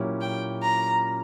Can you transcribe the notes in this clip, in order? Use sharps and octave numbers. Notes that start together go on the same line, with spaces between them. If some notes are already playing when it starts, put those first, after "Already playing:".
Already playing: A#2 F#3 C#4 E4 G4
G5
A#5